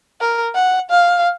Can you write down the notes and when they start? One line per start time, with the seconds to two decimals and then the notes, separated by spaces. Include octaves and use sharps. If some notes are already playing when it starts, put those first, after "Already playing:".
0.21 A#4
0.55 F#5
0.90 F5